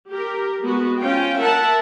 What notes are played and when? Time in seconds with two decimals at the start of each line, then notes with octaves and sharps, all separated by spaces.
0.11 G4 A#4
0.61 G#3 B3 F#4
1.00 C#4 F4 G5
1.41 A#4 E5 F#5 A5